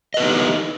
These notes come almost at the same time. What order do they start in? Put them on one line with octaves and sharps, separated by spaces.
D#5 B4 B3 D#4 G4